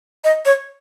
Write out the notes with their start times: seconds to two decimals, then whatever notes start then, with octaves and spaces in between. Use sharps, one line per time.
0.24 D#5
0.45 C#5